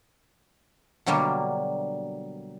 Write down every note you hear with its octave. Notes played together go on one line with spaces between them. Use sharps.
B2 D3 F#3 G3 A#3